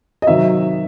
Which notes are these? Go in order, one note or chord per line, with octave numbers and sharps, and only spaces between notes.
D#5
C3 D#3 F#3 E5